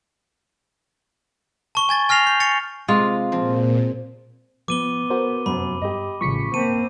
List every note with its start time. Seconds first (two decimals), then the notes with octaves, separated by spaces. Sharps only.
1.75 A5 C#6 G7
1.89 G#5 G#6 A6
2.09 G#5 F6 A#6 C7 F7
2.26 G6 C7
2.40 C#6 A6 C#7 F7
2.89 C3 G#3 F4
3.32 A#2 F3 C4
4.68 F3 B3 D6 D#7 G7
5.10 F#4 A#4 C5
5.46 F1 F#2 B5
5.82 G2 G4 D#5
6.21 A1 C#3 F3 C#6 B6 C#7
6.54 A#3 C4 A5 D#7